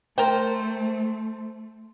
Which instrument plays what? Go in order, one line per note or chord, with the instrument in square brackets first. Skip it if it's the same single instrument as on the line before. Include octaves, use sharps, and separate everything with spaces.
[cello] A3 [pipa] A#4 G5 [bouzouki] C5